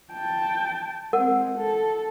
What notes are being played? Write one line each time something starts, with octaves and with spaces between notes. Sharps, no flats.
G5 A5
G#3 C4 A#4 F#5
A4